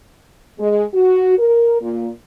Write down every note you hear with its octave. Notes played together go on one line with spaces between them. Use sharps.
G#3
F#4
A#4
A#2